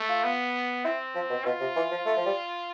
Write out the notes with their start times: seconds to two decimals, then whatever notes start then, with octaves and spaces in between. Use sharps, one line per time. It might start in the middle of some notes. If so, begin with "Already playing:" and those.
Already playing: A3
0.09 F4
0.24 B3
0.84 C4 E4
1.15 F3
1.29 B2
1.45 B2 F4
1.60 C3
1.76 E3
1.91 F3
2.06 A3
2.17 F3
2.26 G3